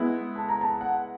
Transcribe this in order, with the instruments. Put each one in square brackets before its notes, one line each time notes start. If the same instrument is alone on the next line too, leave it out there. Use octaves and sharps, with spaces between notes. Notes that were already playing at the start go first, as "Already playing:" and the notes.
Already playing: [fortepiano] G#3 B3 E4
[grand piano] A5
A#5
A5
F#5